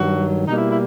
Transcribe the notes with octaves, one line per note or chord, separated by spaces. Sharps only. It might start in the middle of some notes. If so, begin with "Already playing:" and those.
Already playing: G2 D#3 F#3 F#4
B2 G3 A#3 D#4
E4
E4